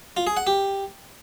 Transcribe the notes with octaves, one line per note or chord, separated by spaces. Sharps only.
F4
G#4
F#5
G4